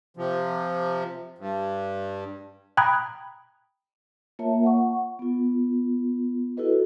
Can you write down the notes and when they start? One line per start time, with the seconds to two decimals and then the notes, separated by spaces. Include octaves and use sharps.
0.17 C3 F3
1.38 G2
2.77 G5 A#5 B5 D#6 F#6 G#6
4.39 A#3 F4 A#4 C#5 E5 A5
4.64 F#5 C#6
5.19 B3 F4
6.57 E4 F#4 A4 B4 D#5